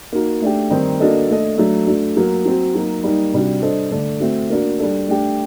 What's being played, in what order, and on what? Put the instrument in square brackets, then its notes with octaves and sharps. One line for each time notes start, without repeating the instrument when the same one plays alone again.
[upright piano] A#3 D#4 F#4
A3 D4 G4
D#3 G3 C4 D#4
A#3 D4 F#4 A4 D#5
A3 D4 A4 D#5
F#3 A3 D4
A3 D4 F#4
F#3 A#3 F#4
F#3 C4 F#4
F#3 A#3 D#4
G3 A#3 D#4
C3 G3 D4 F#4
G3 D4 A4 C5 D#5
D3 A3 D4 A4 D5
A3 C4 F#4
A#3 D4 F#4
G3 D4 A4
A3 D4 G4